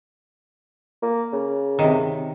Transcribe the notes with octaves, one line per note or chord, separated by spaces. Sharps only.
A#3
C#3
C3 D#3